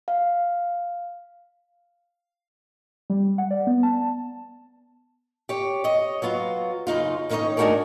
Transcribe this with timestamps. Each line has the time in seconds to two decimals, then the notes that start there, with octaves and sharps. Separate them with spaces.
0.08 F5
3.10 G3
3.38 F#5
3.51 D5
3.67 B3
3.83 A5
5.49 G4 C#5
5.84 C#5 D#5
6.22 F#3 B3 F4 F#4
6.87 F#2 C#3 D#4 F4
7.29 D#3 C#4 D#4 B4 C#5 D#5
7.57 A3 D4 D#4 F#4 G#4 A#4